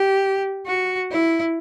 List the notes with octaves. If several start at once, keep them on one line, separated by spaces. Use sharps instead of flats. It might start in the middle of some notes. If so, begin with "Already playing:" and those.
Already playing: G4
F#4
E4